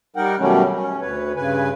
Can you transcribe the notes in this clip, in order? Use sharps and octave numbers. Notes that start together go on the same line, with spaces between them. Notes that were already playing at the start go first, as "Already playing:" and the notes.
G3 D#4 A#4 F#5 G5
B2 D#3 F#3 G3 A3 C#4
C#4
D2 B4 C#5
G2 C#3 B4 G#5